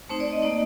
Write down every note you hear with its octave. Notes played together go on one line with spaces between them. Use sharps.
A3 C4 D#4 C5
D5
D#5
A#3 D#4 D5